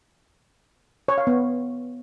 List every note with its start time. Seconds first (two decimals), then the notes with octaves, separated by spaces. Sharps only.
1.08 C#5
1.18 F5
1.27 B3